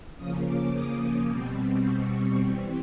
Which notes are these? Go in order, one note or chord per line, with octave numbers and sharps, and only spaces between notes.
C#3 F3 A#3 C#4 D#6
D6
D#6
D6
B2 G3 C4
C#6
E3 G3 C4